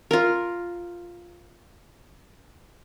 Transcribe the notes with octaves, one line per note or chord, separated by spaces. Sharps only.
F4 A#4